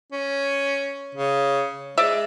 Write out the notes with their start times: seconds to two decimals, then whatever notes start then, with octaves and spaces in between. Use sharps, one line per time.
0.12 C#4
1.15 C#3
1.98 G#3 D5 E5